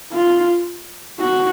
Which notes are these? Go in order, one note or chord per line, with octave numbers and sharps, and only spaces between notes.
F4
F#4